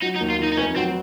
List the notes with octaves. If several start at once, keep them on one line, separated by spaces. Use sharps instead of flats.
F#3 D#4
D#4
D#2
F4
D#3 D#4
D#4
F1 C#4
F#3 C4